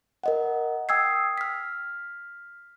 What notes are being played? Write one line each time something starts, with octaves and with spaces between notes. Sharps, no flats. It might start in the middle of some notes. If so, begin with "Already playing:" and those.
A#4 D#5 F#5
G5 D#6 E6 G#6 C7
F6 B6